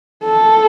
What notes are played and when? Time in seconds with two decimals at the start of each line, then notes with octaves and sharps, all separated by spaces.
0.24 A4